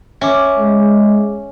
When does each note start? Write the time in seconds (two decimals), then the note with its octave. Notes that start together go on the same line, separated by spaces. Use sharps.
0.21 C#4 E5 D6
0.59 G#3